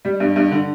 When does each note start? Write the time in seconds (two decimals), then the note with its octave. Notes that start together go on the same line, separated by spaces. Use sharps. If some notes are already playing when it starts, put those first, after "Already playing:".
0.05 G3
0.20 G2
0.36 G2
0.51 D3